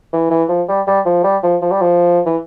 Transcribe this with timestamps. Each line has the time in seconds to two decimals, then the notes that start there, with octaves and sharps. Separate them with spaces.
0.13 E3
0.30 E3
0.49 F3
0.68 G3
0.87 G3
1.06 F3
1.24 G3
1.43 F3
1.61 F3
1.71 G3
1.81 F3
2.26 E3